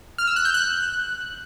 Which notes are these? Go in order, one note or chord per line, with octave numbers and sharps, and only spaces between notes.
F6
E6
F#6
G6
F#6